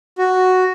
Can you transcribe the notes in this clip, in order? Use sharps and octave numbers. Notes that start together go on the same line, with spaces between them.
F#4